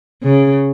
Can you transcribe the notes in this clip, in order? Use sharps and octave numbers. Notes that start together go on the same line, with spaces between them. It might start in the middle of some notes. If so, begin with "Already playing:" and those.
C#3